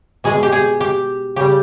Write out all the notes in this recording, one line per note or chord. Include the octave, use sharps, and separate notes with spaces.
B2 G#3 G#4
G4
G#4
G4
C#3 G3 G4